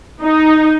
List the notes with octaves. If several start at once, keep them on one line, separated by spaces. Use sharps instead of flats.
D#4